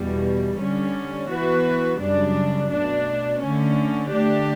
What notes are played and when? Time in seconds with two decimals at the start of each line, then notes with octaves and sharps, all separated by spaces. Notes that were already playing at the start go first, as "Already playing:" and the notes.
Already playing: E2 B2 G3
0.59 D3 G3 C#4
1.29 E3 B3 F#4 B4
2.00 F#2 C#3 G3 D4
2.70 B2 A3 D4
3.41 D3 A3 C#4
4.11 D3 A3 D4 G4